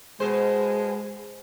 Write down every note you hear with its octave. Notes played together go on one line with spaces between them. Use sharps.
B2 G#3 C5